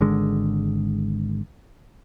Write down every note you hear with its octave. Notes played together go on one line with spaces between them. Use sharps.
G#1 D3 G#3